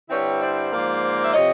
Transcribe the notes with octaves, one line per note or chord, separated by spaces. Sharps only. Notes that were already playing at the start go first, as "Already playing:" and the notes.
G2 D3 G3 C4 E4 B4 C#5
C5 D5
G#2 F3 A#3
E5
C3 F3 C#5 D#5